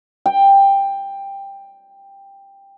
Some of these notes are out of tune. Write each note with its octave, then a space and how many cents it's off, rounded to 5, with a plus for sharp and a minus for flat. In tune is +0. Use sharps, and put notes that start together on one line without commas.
G5 +10